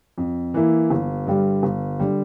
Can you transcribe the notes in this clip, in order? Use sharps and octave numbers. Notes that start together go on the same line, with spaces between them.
F2
E3 A#3 E4
G1
G2 D3 G3
G1
D3 G3